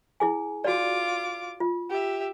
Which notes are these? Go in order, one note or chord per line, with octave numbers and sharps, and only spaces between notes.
E4 G#4 G#5
F4 F#4 D5 D6
F4
G4 E5